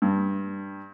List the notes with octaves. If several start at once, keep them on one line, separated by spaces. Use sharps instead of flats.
G2